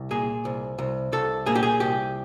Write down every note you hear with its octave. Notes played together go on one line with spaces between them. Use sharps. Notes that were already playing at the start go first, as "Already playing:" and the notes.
Already playing: C2
A#2 G#4
C2
C2
C2 A4
A#2 G#4
G4
G#4
C2 G4